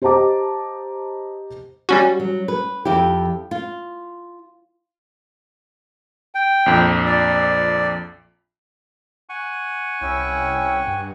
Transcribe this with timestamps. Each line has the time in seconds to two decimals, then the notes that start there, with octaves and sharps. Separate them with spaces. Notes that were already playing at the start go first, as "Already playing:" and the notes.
0.02 G4 C5 D#5 A5 A#5 D6
1.89 G3 C#4 F#4
2.20 F#3
2.48 B4
2.85 F2 E4 G4
3.51 F4
6.35 G5
6.66 A#1 F2
7.06 D5
9.29 F#5 G#5 C#6
10.01 C2 C#4 E4 G5
10.87 G2